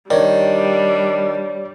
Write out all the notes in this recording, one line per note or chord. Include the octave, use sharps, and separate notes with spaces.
D#3 G3 D4 C#5 D5